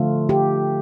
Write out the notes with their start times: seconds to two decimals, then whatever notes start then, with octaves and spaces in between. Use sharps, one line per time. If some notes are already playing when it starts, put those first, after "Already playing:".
Already playing: D3 F3 A3 F4
0.29 G4